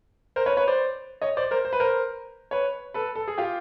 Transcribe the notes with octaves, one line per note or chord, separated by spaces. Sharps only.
A#4 C5
B4 C#5
B4 C#5
C5 D5
C#5 D#5
C5 D5
A#4 C5
C5
B4
A#4 C5
B4 C#5
A4 B4
A4
G#4
F4 G4